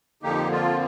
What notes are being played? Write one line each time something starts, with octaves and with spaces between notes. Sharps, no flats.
F2 D3 F3 A#3 D#4 G4
F4